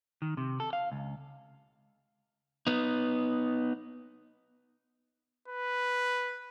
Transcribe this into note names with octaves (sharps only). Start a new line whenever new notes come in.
D#3
C3
A4
F5
C#2
B3 D#4
B4